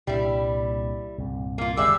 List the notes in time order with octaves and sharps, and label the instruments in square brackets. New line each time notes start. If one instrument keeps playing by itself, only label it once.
[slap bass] C2 A#2 D4 [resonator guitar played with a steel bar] G3 E4
[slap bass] C2 G2 A#2
[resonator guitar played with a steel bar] A#3 F4
[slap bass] F1 D3 D#3 [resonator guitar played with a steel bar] G3 G#3 E5 [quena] D6 [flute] E6